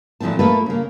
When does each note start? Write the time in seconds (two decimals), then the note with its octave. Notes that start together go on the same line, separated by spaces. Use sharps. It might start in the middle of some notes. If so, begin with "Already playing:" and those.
0.20 A#2 E3 F3 A3 C4 A5
0.39 A3 A#3 F4 A4 B4
0.66 C#3 A#3